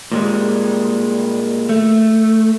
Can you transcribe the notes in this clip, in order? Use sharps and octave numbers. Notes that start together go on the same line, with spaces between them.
A#2 G3 G#3
A3